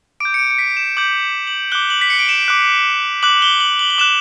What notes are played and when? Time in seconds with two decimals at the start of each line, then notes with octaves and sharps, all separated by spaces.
0.20 D6 G6 D7
0.34 C#7
0.39 D7
0.51 C#7
0.58 B6
0.77 E7
0.97 D6 G6 F#7
1.47 F#7
1.71 D6 F#6 G7
1.90 F#7
2.01 B6
2.10 C#7
2.19 D7
2.29 E7
2.48 D6 F#6
3.23 D6 F#6 F#7
3.42 G7
3.60 F#7
3.79 F#7
3.91 F#7
3.98 D6 F#6 E7